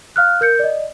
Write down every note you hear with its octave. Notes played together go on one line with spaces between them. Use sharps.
F5 F6 F#6
A#4 G6 C#7
D5 D#5